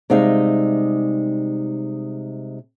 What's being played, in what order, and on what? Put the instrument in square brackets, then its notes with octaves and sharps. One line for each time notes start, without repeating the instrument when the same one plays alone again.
[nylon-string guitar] C3 G3 G#3 D#4 E5 F5